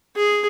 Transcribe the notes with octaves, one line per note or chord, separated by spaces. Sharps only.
G#4